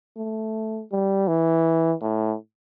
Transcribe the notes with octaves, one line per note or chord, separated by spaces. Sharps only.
A3
G3
E3
A2